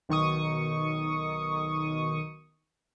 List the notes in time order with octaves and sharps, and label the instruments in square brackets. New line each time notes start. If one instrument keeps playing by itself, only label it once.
[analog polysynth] B1 D#3 C#6 D#6